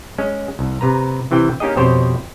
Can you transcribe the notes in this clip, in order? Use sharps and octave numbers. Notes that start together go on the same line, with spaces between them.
G#3 C#4
C2
C3 B4 A#5
C3 E3 C4 G5
A#3 C#4 D#4 G4 G#4 D#5
F2 B2 C4 G4 C5 C#5